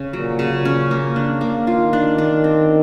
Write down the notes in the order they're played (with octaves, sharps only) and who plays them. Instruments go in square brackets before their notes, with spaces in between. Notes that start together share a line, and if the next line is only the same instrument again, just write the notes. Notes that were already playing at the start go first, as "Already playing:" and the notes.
Already playing: [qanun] C#3 C#4
[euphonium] A#2 [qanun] F#3
[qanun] C#3
[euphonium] A#2
[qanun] C#4
A#3
D4
A#3
[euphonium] D#3 [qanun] F4
[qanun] D4
D4
C4